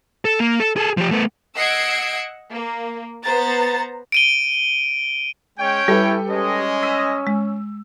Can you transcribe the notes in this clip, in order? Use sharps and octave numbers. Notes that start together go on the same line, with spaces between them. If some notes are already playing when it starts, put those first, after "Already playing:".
A4
A#3
A4
G#4 A4
F3 G4
A3 B3
D#5 F#5 E6 G#6 C7 D7
A#3
B3 C5 A#5 A6
D7 D#7 G7
G#3 C#4 C#5 G5
G3 E4 G4 A4 B4
G#3 C#4 D#5
E6 B6 D#7
G#3